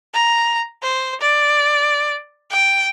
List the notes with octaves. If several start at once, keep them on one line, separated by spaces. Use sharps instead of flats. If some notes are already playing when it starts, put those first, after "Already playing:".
A#5
C5
D5
G5